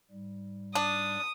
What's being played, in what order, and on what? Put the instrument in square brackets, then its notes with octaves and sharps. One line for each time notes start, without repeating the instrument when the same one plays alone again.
[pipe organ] G#2 G3
[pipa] D4 [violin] D#6